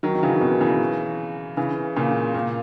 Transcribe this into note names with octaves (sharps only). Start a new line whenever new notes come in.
D#3 F#3
D#3
C#3 E3
B2 D#3
C#3 E3
C#3 E3
A#2 C#3
A#2